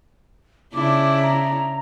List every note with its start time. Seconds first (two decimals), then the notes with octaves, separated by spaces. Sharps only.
0.74 C#3 D4 E4 D6
1.23 A#5